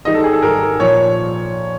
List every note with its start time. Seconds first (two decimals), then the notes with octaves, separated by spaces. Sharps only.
0.05 G#2 D#3 G3 D#5
0.14 A4
0.24 G#4
0.33 A4
0.42 G#2 D#3 G3 A#4
0.80 A#2 F3 C#5